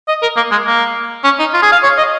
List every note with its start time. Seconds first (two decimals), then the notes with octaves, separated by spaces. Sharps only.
0.08 D#5
0.22 A#4
0.37 A#3
0.51 G#3
0.66 A#3
1.24 C#4
1.39 D#4
1.54 F4
1.63 G#4
1.72 F5
1.83 C#5
1.98 D#5